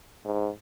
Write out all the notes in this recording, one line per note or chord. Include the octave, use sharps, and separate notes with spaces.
G#2